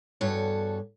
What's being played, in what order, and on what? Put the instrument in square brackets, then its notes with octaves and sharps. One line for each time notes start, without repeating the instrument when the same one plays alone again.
[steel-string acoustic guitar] E2 G2 F#4 A4 C#5